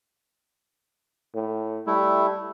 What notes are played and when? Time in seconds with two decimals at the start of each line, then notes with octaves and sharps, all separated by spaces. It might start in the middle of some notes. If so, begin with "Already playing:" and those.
1.35 A2
1.87 G3 A3 E4